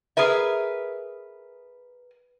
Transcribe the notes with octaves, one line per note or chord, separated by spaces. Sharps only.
G#4 A#4 B4 E5